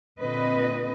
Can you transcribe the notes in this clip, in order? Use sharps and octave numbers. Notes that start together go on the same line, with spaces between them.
A#2 D3 C4 B4 D#5